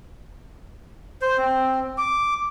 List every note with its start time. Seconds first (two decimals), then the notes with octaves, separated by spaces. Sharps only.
1.22 C5
1.37 C4
1.98 D6